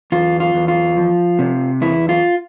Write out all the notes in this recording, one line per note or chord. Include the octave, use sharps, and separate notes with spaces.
E2 F4
F4
E2
F4
F3
C3
E2 E4
F4